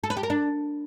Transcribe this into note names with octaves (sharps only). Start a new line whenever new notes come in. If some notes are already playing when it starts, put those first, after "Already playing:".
A4
B4
G4
A#4
D4